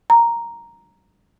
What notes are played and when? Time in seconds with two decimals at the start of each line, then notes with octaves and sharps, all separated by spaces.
0.10 A#5